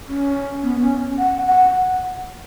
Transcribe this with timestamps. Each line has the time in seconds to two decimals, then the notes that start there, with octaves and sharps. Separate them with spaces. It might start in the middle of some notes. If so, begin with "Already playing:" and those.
0.08 C#4
0.63 B3
0.82 C#4
1.19 F#5
1.47 F#5